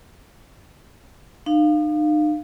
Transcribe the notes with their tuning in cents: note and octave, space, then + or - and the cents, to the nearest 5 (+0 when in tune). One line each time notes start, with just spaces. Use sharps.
D#4 -40 F5 +0